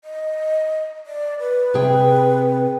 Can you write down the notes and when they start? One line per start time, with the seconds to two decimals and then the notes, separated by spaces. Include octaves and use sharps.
0.04 D#5
1.06 D5
1.40 B4
1.74 C3 G#4 G5